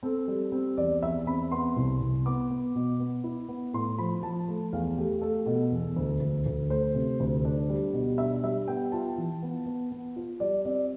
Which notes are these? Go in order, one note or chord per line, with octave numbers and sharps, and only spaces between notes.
C4 A4
G3
C4
E2 D5
E2 E5
C4 B5
B3 C6
C2
C2
B3 D6
B3
B2
B3
E4
B3
A2 C6
F3 B5
F3 A5
A3
E2 F5
A3 G4
A3 A4
B2
E2
D2
D2
D2
A3 C5
C3
D2
D4 D5
G3
B2
D4 E5
G3 E5
B3 G5
F4 A5
E3
B3
B3
B3
F4
G3 D5
C4 D5